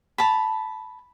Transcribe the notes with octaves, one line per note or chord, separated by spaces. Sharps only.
A5 B5